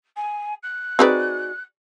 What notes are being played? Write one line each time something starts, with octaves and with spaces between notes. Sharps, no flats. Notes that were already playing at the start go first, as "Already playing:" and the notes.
G#5
F#6
C4 D#4 F#4 G#4 B4 D5